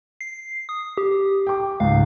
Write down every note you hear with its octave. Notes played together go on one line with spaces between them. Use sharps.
C7
D#6
G4
G5 D6
C#2 G#2 F5